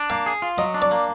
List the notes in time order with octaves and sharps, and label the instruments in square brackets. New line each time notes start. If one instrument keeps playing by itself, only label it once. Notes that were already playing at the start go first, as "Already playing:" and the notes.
Already playing: [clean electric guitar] D4
[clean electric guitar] A#3 [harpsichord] F5
[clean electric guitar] G#4
F4
[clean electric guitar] F#3 [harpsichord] D#5
[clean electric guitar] D4
[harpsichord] D5
[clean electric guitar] A#3